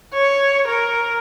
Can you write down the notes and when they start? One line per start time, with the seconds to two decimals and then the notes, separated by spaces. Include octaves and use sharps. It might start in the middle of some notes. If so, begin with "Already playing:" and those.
0.14 C#5
0.68 A#4